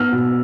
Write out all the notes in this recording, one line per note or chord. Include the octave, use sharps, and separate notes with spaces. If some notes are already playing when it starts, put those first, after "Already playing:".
Already playing: B3 E6 F6
B2